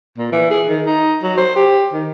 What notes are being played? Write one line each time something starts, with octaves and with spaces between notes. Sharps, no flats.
A#2
E3
G#4
D#3
D#4
F#3
C5
G4
D#3